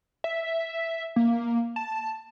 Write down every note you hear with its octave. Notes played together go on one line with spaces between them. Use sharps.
E5
A#3
A5